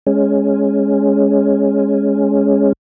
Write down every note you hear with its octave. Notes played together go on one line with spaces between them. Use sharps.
G#3 C#4